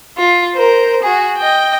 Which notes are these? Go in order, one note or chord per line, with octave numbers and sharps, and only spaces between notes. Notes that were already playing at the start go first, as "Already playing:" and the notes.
F4
A#4 C5
F#4 G#4
D#5 G5